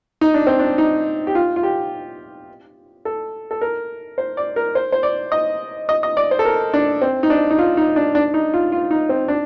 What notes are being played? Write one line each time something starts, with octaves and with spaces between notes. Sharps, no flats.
D#4
D4
C4
D4
D#4
G4
F4
F4
G4
A4
A4
A#4
C5
D5
A#4
C5
C5
D5
D#5
D#5
D#5
D5
C5
A4
A#4
D4
C4
D#4
D4
D#4
F4
D#4
D4
D4
D#4
F4
F4
D#4
C4
D4